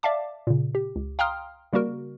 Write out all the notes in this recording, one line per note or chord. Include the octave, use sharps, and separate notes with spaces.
D5 E5 F5 A5 D6
A#2 C#3
G4
C#2
F5 G5 A#5 C6 D#6 F6
C#3 G3 A#3 F#4 A#4